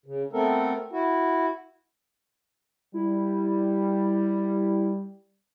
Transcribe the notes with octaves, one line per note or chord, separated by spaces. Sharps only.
C#3
A3 B3 C4 A4 A#4
E4 F#4
G3 E4